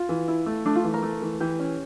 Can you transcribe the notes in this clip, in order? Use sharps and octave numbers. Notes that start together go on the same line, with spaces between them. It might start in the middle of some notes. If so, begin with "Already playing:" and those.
Already playing: F4
E3
E4
A3
A3 D4
F4
E3
A#4
A3
E3
E3 G4
C#4